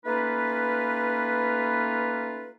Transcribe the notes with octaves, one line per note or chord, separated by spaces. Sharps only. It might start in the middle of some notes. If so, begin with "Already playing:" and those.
A3 A#3 C#4 D#4 F4 B4